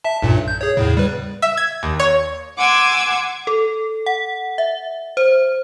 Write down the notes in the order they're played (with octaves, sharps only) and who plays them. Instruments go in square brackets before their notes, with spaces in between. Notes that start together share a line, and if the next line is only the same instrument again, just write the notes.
[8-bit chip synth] E5 A5
B1 G2 A#2
G6
G#4 C#5
E2 A2 C#3
G3 B4
[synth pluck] E5
G#6
D#2
C#5
[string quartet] F#5 G#5 C6 D6 E6 G#6
[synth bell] A4
F#5
E5
C5